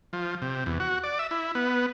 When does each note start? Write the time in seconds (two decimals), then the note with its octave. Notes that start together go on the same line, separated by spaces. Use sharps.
0.13 F3
0.42 C3
0.66 E2
0.80 F#4
1.04 D5
1.19 E5
1.31 E4
1.55 B3